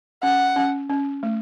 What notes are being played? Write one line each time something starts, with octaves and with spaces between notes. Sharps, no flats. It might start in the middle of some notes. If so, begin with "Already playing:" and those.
C#4 F#5
C#4
C#4
A3